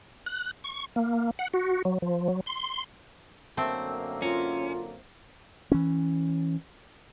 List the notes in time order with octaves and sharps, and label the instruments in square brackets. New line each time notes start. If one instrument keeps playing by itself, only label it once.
[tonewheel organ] F#6
C#6
A#3
F#5
F#4
F#3
F3
F#3
C6
[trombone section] F#2 D3 A#3 [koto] A3 C4
[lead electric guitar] C#4 [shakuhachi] F4 [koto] A#5
[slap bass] E3 C#4